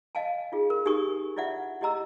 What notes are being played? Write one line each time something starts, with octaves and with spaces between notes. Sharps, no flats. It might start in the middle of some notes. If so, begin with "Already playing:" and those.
D#5 F5 G#5 A5
D#4 F4 G#4
A#4
D#4 G4 A#4 G#5 C#6 D#6
E4 F4 D5 E5 F#5
E4 G4 D#5 A#5 E6